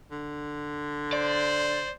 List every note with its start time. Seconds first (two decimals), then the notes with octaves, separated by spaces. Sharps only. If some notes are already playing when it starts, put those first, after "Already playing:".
0.11 D3
1.13 C5 D5